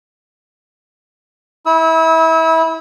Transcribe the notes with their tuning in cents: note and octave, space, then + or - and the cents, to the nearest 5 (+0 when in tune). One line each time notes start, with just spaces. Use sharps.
E4 -25 E6 -35